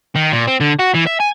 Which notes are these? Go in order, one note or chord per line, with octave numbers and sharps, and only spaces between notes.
D#3
A#2
C4
D3
F#4
E3
E5
G#5